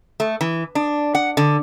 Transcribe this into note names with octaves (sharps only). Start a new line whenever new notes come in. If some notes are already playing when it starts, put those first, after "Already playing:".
A3
E3
D4
F#5
D3